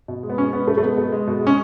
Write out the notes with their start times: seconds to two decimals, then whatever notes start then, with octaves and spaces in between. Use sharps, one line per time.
0.08 B2
0.23 G#3
0.29 B3
0.37 B2 C#4
0.52 G#3 B3
0.67 B2 A3
0.78 A3
0.82 G#3 B3
0.97 B2
1.12 G#3
1.27 B2
1.41 G#3
1.47 C#4